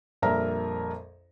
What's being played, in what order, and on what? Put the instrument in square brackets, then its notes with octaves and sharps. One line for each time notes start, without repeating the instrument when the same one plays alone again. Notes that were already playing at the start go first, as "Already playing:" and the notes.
[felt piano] A#1 F2 G3 A#4 E5 A#5